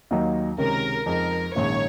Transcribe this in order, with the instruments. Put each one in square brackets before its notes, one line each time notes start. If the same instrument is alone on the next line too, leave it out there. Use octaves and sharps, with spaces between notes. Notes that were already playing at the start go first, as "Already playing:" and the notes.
[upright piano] D#2 D#3 F#3 A#3 D#4
[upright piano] C#2 C3 D#3 G#3 C#4 [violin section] A#4
[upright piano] F2 C#3 G#3 D#4 [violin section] A#4
[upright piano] A#1 G#2 D#3 A#3 C#4 [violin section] C#5